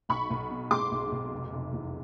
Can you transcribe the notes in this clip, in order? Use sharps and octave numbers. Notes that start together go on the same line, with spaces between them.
B1 B5 C#6
B1
B2
G#3 C6 D6
B1
B1
F1
F1
E2